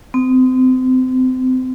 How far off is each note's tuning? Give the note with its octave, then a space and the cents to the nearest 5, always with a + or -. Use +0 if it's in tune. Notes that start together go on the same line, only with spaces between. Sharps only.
C4 -30